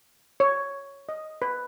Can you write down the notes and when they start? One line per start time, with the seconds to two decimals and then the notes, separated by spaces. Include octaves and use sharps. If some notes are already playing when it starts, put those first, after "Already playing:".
0.40 C#5
1.09 D#5
1.42 B4